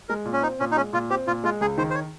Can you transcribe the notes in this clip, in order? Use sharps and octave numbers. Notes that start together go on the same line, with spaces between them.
G#3 A#4
A#2
C#4
C4 D#4
A#2 C#4
D#4
G#3 C#4
A#2 F4
C4 G4
A#2 F4
G#3 F4
C#2 G#4
D#3 C5
C5
C#5